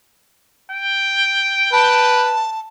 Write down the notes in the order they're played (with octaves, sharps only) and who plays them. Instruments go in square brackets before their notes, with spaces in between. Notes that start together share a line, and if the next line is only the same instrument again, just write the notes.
[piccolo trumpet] G5
[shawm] B4 [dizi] A5